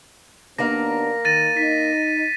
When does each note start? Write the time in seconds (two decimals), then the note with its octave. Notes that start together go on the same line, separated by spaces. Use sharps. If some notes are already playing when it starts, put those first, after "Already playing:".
0.58 D#2 A#3 B3 D4 A#4 F5 A#6
1.25 D#3 A6 A#6 D#7
1.57 D#4 B6